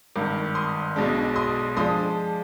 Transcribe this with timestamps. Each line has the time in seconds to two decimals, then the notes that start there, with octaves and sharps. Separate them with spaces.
0.16 G#1 G2 D#3
0.55 C6 D#6
0.96 B1 B2 G#3 D4
1.36 C6 D#6
1.77 F3 G#3 D4 C6 D#6